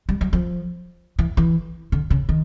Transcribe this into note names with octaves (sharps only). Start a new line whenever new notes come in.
G3
F#3
F3
E3
E3
D3
C#3
D#3